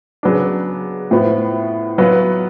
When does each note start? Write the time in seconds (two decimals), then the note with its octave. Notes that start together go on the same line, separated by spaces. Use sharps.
0.23 C#3 F#3 B3 D4
1.11 A2 F3 B3
1.98 F#3 B3 F4 B4